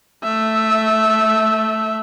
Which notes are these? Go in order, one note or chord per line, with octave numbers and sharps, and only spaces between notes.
A3 E5